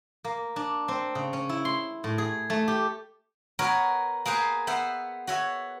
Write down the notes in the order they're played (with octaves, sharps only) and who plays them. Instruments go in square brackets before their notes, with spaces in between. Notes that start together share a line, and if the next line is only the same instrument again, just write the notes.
[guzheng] A#3
D4
C4
C#3
C#4
E4
C6
A2
G#4
A3
G4
B3 F#4 A#4 C#5
A#3 G#4 B4 C5
B3 C5 E5 F#5
F#4 C#5 E5